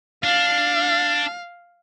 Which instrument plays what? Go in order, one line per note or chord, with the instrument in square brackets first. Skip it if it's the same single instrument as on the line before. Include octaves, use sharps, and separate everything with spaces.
[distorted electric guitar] D4 [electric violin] F5